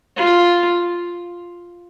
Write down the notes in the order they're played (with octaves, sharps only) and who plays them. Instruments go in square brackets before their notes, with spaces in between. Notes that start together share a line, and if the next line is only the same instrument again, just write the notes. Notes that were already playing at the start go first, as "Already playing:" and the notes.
[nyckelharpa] F4